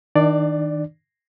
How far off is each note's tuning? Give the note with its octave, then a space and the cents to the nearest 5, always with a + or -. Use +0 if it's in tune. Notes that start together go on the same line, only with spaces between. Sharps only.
D#3 +20 D4 +35 D5 +0